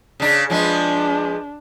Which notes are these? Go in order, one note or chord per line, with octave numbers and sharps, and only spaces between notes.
C#3 D4
F3 G#3 B3 D4